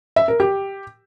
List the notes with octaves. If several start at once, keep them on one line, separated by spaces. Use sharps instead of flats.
E5
A#4
G4